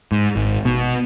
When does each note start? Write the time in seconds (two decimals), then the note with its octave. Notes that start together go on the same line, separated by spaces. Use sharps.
0.12 G#2
0.36 G#1
0.65 B2